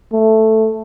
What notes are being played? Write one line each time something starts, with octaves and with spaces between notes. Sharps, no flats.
A3